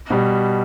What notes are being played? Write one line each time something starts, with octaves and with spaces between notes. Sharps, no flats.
B2 G3